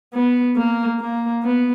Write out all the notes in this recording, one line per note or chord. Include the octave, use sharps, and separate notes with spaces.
B3
A#3
A#3
B3